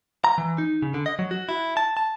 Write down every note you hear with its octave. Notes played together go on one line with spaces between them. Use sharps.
A#5
E3
D#4
C#3
D3
D#5
F#3
F#4
E4
A5
A5